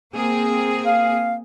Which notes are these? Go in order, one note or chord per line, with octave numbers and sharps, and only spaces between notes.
A#3 C4 G#4
F5